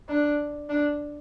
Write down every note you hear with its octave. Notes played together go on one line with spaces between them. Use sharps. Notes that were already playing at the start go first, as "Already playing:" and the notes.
D4
D4